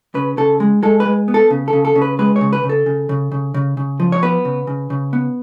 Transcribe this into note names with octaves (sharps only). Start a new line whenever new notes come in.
C#3 B4
C#3 A4
G#3
G#3 A4
B4
G#3
B3
A4
C#3
A4
C#3
A4
C#3
B4
G#3 B4
C#5
C#3
B4
C#3
A4
C#3
C#3
C#3
C#3
C#3
F3
C#5
B3 B4
C#3
C#3
C#3
B3